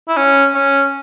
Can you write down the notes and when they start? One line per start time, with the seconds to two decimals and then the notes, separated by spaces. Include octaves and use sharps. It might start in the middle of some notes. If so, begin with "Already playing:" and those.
0.08 E4
0.17 C#4
0.55 C#4